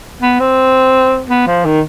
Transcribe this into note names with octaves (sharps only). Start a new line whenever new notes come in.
B3
C4
B3
F3
D#3